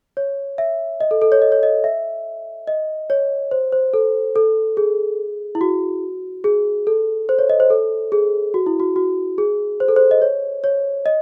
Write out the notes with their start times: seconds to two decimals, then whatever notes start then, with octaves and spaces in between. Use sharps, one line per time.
0.17 C#5
0.58 E5
1.01 D#5
1.11 A4
1.22 A4
1.32 C#5
1.42 D#5
1.52 C#5
1.63 D#5
1.84 E5
2.67 D#5
3.10 C#5
3.51 C5
3.72 C5
3.94 A4
4.36 A4
4.77 G#4
5.55 E4
5.61 F#4
6.44 G#4
6.87 A4
7.29 C5
7.39 C#5
7.49 D#5
7.60 C5
7.70 A4
8.12 G#4
8.54 F#4
8.66 E4
8.80 F#4
8.96 F#4
9.38 G#4
9.80 C5
9.88 A4
9.96 C5
10.11 D#5
10.22 C#5
10.64 C#5
11.06 D#5